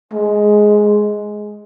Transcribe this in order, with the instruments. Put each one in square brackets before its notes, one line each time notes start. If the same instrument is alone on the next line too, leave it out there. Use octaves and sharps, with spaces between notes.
[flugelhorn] G#3